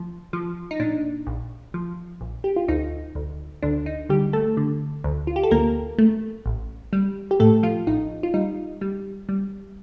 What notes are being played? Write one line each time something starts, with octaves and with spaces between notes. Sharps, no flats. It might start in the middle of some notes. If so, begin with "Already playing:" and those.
Already playing: F3
F3
D#4
A#2 D4
A#1
F3
A#1
G4
F4
D2 D#4
D2
D2 D4
D#4
D3 G3 G4
A3 A4
D3
D2
F4
G4
A4
D2 A#3 A#4
A3
A1
G3
G4
A2 A3 A4
F3 F4
A1 D#4
F4
G3 D#4
G3
G3